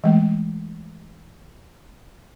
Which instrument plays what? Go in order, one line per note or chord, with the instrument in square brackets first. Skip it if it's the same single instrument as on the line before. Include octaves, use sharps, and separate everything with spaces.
[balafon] E3 G#3 A3